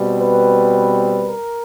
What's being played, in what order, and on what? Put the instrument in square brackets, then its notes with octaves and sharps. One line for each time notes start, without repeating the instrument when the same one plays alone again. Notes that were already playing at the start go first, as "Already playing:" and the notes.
Already playing: [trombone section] B2 G3 C4
B4
A#4